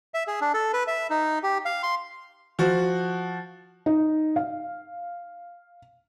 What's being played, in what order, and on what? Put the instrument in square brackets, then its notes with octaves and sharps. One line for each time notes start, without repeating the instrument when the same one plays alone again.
[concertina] E5
G#4
D4
A4
B4
E5
D#4
G4
F5
C6
[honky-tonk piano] F3 F#4
[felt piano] D#4
F5